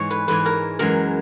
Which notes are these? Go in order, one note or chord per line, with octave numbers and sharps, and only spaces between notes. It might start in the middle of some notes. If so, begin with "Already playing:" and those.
Already playing: G#2 E3 G#3 C#5
B4
G#2 E3 G#3 B4
A#4
F#2 E3 G#3 A#4